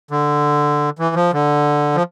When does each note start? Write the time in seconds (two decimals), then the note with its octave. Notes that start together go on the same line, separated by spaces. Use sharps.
0.11 D3
0.99 E3
1.16 F3
1.33 D3
1.96 F3